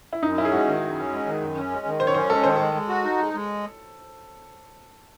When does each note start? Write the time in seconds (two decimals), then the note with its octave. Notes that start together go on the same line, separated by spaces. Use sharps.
0.13 E4
0.23 F#2 D#4
0.38 C#4 E4
0.45 G#4
0.52 G#3 F#4
0.67 D#3
0.83 F#2
0.97 C#4
1.12 G#3
1.26 D#3
1.41 F#2
1.56 C#4
1.71 G#3
1.86 D#3
2.00 F#2 C5
2.07 C#5
2.14 C#4 C5
2.29 G#3 A4
2.43 D#3 C5
2.56 G#3 A4
2.74 G#3
2.89 F#4
3.04 D#4
3.19 G#3
3.34 G#3